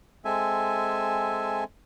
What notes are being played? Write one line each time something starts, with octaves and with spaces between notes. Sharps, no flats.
G#3 C4 A4 E5 G#5